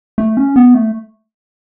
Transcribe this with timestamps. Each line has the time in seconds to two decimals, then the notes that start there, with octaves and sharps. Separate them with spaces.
0.18 A3
0.37 C#4
0.56 B3
0.74 A3